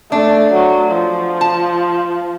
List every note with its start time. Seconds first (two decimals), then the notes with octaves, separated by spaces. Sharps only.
0.12 A3 D4
0.53 F#3
0.92 F3
1.41 A5